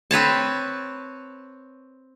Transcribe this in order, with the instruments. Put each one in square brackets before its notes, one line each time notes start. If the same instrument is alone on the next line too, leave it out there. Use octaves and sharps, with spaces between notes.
[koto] C4 B4 C#5 A5